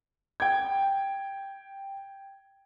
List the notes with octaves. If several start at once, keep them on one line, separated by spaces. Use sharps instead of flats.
G5 G#6